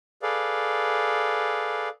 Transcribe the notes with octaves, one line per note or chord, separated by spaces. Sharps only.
G#4 A4 B4 D5 F5